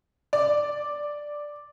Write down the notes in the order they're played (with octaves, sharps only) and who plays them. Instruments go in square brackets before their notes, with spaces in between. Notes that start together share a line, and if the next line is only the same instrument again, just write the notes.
[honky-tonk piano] D5